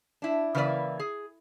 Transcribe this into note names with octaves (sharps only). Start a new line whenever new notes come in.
D4 E4
C#3 E3 A#3 B4 D5 E5
G#4